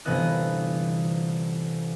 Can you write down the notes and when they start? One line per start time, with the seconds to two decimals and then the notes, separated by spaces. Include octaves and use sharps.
0.05 G1 C3 E3 B3 D#5 F#6